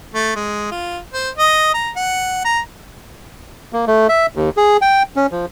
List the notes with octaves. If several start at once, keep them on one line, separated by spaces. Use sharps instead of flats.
A3
G#3
F4
C5
D#5
A#5
F#5
A#5
A#3
A3
E5
D#2
G#4
G5
C#4
F3